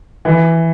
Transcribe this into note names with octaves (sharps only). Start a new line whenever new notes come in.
E3